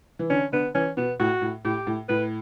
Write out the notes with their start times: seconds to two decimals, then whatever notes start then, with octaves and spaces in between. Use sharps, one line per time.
0.19 E3
0.30 D3 C#4
0.52 D3 B3
0.75 E3 C#4
0.97 B2 B3
1.20 A2 F#4
1.42 A2
1.65 A2 G4
1.87 A2
2.09 A2 B4